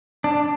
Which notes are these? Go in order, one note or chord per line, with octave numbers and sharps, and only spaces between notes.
D4